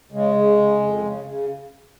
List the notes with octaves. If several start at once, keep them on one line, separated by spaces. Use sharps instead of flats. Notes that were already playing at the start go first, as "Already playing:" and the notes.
C#3 G#3
C#3
C#3
F2
C#3
C#3